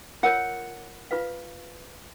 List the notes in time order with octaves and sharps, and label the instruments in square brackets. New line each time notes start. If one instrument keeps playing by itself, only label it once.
[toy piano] F4 A#4 C#5 [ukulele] F#5
[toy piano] F4 B4 F5